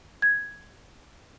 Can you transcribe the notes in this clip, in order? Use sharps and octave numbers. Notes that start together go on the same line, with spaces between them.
G#6